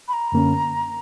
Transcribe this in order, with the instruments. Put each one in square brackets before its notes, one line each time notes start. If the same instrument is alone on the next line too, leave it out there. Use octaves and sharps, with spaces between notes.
[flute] B5
A#5
[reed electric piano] F#2 D3 A#3 C#4